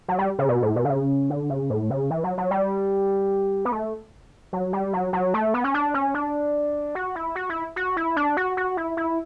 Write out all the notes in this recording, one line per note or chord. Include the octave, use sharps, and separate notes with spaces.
F#3
G3
C#3
B2
A2
B2
D3
C#3
D3
C#3
A2
C#3
E3
F#3
F#3
G3
B3
A3
F#3
G3
F#3
F#3
A3
B3
C#4
D4
C#4
D4
F#4
E4
F#4
E4
F#4
E4
D4
F#4
F#4
E4
E4